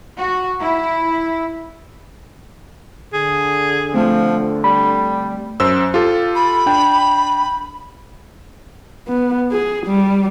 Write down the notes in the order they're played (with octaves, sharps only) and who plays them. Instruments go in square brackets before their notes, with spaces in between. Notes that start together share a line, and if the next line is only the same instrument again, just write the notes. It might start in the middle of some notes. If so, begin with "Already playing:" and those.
[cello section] F#4
E4
[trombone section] D3 [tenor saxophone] G#4
[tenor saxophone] F3 [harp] A3 C4
[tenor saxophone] G3 [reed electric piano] B5
[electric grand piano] F#2 C5 E6
F4 G4 A4
[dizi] B5
[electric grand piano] D4 G5
[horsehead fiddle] B3
G#4
G3